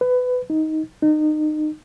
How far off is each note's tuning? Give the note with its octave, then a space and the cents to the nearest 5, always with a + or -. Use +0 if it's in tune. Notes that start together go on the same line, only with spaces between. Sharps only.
B4 +20
D#4 +15
D#4 -25